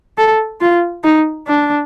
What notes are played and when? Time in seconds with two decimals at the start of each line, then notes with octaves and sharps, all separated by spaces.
0.18 A4
0.61 F4
1.04 D#4
1.47 D4